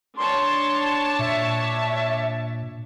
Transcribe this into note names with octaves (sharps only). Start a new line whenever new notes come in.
D4 C#5 A5 C6
A#2 E5